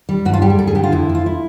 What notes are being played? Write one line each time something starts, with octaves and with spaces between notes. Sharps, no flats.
G3
G2 F#4
F4
G3 G4
G#4
G2 A4
G#4
D3 G4
F4
F2 E4
F3
F4
E4